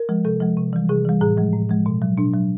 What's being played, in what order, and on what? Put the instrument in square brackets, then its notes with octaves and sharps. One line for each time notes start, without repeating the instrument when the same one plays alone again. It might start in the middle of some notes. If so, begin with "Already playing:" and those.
Already playing: [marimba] A#4
F3 G#3
C3 A4
F3 G#3
C3
E3 G3
C3 G#4
E3 G3
A2 G#4
F3 G#3
A2
F3 G#3
B2
F#3
B2 D4
F#3